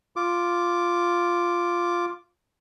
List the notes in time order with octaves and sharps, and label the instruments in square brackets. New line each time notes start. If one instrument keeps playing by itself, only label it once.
[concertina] F4 D6